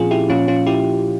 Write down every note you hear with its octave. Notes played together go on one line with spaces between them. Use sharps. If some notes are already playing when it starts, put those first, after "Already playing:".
Already playing: A#2 F3 C4 C#4 F4 G#4
E4 G4
A#2 F3 C#4 F4
C#4 F4
E4 G4